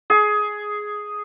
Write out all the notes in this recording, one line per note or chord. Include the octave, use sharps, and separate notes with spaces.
G#4